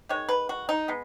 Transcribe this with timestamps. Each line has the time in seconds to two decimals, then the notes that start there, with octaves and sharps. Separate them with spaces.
0.09 D#3 G#3 C#5
0.29 B4
0.49 F#4
0.69 D#4
0.88 G#3 B3